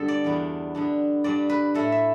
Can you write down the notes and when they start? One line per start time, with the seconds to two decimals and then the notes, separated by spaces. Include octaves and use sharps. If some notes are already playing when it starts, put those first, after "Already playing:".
Already playing: G2 D3 G3 B3 A4
0.08 D5
0.24 E2 D3 B3
0.75 D3 B3 D4
1.24 G2 G3 D4 D5
1.49 B4
1.74 A2 A3 E4 A4
1.92 E5